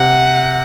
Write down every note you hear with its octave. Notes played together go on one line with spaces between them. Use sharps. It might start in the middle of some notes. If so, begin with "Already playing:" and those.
Already playing: C3 F#5